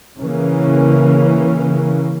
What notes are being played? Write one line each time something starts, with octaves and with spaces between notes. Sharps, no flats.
C#3 E3 A#3 C#4